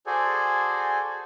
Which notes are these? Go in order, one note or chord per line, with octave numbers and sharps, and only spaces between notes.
F#4 G#4 A4 C5 D5 G#5